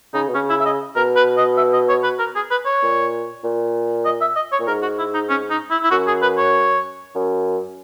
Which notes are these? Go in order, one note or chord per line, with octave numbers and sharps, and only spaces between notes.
C#3 D#4
B2
C#3 C#4
E4
E5
D#5
B2 A#4
B4
D#5
E5
D#5
C#5
B4
A#4
G#4
B4
C#5
A#2
A#2
D#5
E5
D#5
C#5
A#2
G#2 A#4
F#4
E4
D#4
C#4
D#4
E4
E4
F#2 F#4
G#4
B4
C#5
F#2